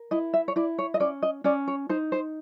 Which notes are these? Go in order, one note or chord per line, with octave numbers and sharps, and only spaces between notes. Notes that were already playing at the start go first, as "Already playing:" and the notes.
Already playing: A#4
E4 D#5
E5
C#5
E4 D5
C#5
D#5
C#4 D5
D#5
C#4 D5
C#5
D#4 C5
C5